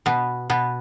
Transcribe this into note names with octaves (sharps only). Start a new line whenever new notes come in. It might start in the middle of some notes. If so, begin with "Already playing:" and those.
B2 B3
B2 B3